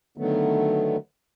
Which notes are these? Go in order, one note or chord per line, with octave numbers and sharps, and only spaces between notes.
D3 D#3 F#3 A3 B3